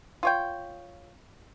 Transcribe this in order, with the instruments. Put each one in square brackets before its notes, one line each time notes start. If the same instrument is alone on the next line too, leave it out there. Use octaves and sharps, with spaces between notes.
[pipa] F4 C#5 G5